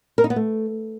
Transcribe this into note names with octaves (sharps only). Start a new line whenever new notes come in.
A#4
D#4
B3
A3